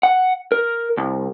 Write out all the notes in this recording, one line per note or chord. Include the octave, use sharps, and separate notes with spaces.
F#5
A#4
C2